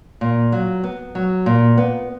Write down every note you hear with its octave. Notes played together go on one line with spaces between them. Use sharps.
A#2
F#3
B3
F#3
A#2
B3